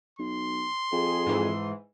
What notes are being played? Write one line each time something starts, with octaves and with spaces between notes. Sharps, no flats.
B1 C6
F2 G#4
G#2 E3